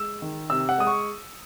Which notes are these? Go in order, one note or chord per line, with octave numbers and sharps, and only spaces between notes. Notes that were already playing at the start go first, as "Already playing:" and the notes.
Already playing: G#3 E6
D#3
C3 E6
F#5
G#3 D#6
C#6